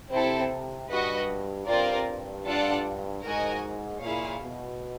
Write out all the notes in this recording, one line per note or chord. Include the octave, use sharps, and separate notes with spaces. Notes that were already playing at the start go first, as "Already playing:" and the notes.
C3 C4 E4 A4
G2 F#4 B4 D#5
G2 C4 F4 A#4 D5
G2
D4 F4 A4 D5 F#5
G#2 F#4 A#4 D#5 G#5
A#2 E4 G#4 C#5 F5
B2